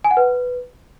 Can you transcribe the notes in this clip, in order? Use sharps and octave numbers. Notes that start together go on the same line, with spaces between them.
G#5
F#5
B4